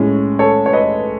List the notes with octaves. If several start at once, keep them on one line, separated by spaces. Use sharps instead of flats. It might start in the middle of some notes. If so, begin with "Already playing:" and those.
Already playing: A2 G#3 C#4
A4 C#5
C#5
B4 D#5